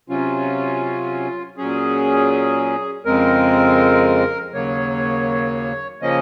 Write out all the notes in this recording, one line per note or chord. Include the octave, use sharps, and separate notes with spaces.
C3 F#3 C#4 F4
A#2 F#3 C#4 G#4
F2 C#3 G#3 C4 A#4
D#2 C#3 F#3 A#3 C#5
C#3 F3 A#3 C#4 D#5